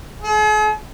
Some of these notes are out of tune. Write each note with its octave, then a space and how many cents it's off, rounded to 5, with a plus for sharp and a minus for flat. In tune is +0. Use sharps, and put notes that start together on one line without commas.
G#4 +45